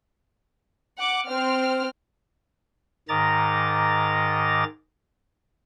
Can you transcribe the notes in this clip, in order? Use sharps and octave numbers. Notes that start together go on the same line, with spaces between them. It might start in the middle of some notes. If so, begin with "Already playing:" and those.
F#5 D6
C4 C5 F6
G#2 D#3 D#5 A#5 D6 A6